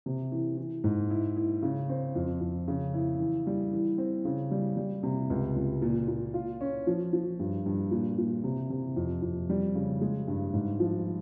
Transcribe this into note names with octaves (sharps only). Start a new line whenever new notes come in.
C3
E3
E3
G#2
E4
E4
C#3
C4
F2
F2
C#3
E4
E3
G3
E3
C4
C#3
G3
G3
C3
C#2
C#2
A#2
A#2
F4
C#4
F3
F3
G2
G2
A#2
A#2
C3
C3
F2
F2
G3
C#3
G#3
G2
G#2
F3